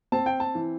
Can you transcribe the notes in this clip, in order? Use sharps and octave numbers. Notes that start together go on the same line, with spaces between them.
C4 A5
G5
A5
E3